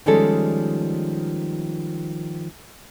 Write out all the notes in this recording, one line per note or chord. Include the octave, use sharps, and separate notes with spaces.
D#3 F3 G3 G#3 C#4 A4